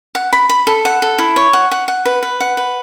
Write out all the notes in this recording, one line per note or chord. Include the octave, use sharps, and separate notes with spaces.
F#5
B5
B5
A4
F#5
A4
E4
C#5
F#5
F#5
F#5
B4
B4
F#5
B4